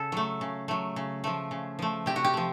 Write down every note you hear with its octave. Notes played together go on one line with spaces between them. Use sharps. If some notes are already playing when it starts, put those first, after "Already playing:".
Already playing: C#3 A4
F#3 A3
C#3
F#3 A3
C#3
F3 A3
C#3
F3 A3
C3 G4
F#4
G4
F3 A3